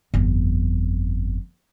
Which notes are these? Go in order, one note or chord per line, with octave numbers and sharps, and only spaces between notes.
G1 F2